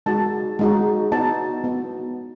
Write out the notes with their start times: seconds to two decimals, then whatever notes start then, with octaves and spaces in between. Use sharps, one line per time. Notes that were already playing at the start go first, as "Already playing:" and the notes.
0.06 G#3 D#4 F#4 A5
0.59 G#3 D#4 F#4
1.12 B3 D#4 F#4 A5
1.64 B3 D#4 F#4